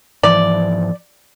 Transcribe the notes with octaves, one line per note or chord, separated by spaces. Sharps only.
G#2 E3 F3 D5